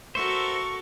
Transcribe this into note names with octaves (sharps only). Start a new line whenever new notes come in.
F#4 A4 A#4 C5 E5 C#6